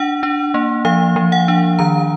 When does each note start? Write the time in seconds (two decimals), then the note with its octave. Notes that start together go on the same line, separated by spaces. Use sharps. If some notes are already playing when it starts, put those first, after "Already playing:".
Already playing: D4 F#5
0.23 D4
0.54 A#3
0.85 F3 F5
1.16 F3
1.32 F#5
1.48 D4
1.79 D#3 A#5